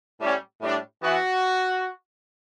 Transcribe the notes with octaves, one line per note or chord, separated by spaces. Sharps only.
A2 G3 C#4
A2 G3 D4
E3 B3 E4 F#4